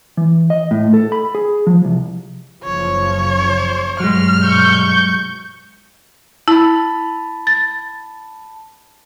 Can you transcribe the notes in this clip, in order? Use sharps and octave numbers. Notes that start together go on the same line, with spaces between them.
E3
D#5
A2
A4
B5
G#4
F3
C2
F#1 C#3 F3 C#5
G2 B2 F#3 G#3 F6
C#6 G6
E4 A5 B5
A6